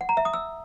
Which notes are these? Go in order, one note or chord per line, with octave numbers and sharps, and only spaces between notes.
F#5
A#5
E5
D#6
E6